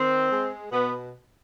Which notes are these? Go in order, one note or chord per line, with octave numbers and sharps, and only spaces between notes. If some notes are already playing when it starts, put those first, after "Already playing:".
Already playing: D#3 C4
G#3
B2 B3